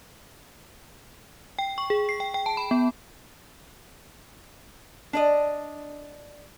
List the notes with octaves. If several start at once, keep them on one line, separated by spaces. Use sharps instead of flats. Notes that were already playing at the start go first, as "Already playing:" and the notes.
G5
C#6
G#4
C7
G5
G5
A5
B5
B3
D4 D5 D#5